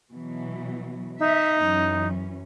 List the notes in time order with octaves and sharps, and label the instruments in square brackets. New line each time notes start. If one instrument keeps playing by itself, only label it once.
[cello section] B2 E3 F#3
[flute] D#4 [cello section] E5
[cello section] F#2 E3 C#4